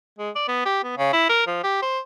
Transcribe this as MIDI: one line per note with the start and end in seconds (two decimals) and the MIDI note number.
0.19 0.30 56
0.35 0.47 74
0.48 0.65 59
0.66 0.80 67
0.84 0.93 59
0.98 1.08 49
1.13 1.27 64
1.30 1.43 70
1.47 1.61 53
1.64 1.82 67
1.82 1.99 72